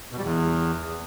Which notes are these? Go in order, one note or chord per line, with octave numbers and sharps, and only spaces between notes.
B2
G3
E2